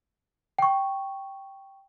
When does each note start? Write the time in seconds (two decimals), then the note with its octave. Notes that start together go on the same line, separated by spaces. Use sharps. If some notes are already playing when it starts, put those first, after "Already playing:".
0.59 G5 C#6